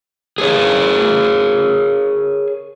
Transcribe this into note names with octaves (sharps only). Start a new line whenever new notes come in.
G#4 A#4 C#5